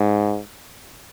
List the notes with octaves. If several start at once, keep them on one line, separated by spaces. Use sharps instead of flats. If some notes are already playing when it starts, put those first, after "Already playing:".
Already playing: G#2